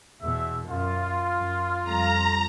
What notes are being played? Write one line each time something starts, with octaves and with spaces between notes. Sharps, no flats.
E2 B2 E5
F#2 F4
F#2
F2 G3 A#5